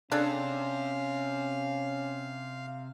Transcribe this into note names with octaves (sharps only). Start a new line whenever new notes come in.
C3 C#4 D4 G#4 A4 F5